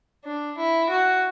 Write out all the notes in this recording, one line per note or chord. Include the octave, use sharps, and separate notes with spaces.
D4
E4
F#4